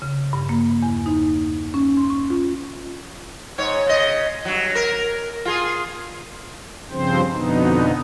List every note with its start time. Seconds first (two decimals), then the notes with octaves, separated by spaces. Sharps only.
0.02 C#3
0.33 G2
0.49 A#3
0.82 E2
1.06 D#4
1.74 C#4
1.97 C6
2.10 C#6
2.30 F4
3.58 G#2 C#5
3.86 C#3 D#5
4.45 G2 F#3
4.75 A#4
5.45 F4 G#4
6.91 G2 C#3 F3 C4 C5
7.31 F2 B2 D3 B3 D#4